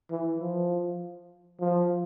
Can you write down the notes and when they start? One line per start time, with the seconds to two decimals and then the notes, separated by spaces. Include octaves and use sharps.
0.11 E3
0.40 F3
1.61 F3